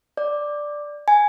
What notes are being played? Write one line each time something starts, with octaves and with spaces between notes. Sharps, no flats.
D5
G#5